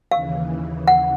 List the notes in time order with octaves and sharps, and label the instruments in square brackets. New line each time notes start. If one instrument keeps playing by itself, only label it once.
[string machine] D#2 C#3 E3 [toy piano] F5
[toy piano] F#5